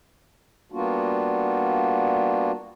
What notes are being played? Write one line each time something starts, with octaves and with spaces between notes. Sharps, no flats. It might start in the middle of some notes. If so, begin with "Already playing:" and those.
G3 A#3 B3 D4 F4 F#4